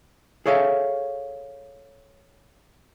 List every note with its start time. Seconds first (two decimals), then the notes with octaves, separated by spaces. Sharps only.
0.46 G#4 A4 C#5 E5 F5